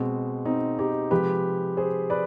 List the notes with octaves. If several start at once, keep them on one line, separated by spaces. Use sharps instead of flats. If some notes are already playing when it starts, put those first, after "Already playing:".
Already playing: B2 G#3 C4
C4 D#4
D#4 G4
C3 F3 G#3 G4 B4
G#4 C5
B4 D5